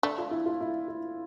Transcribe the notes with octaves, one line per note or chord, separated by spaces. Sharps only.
A3 D4
F4
E4
F4
E4
E4